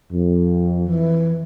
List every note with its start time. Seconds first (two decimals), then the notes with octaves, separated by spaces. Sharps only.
0.12 F2
0.86 E3